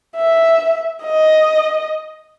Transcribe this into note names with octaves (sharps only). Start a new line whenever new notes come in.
E5
D#5